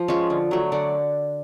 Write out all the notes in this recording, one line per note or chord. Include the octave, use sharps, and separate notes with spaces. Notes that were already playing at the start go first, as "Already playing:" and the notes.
Already playing: F3
G#3 C#4 F4
D3
F#3 A3
D3 D5 F#5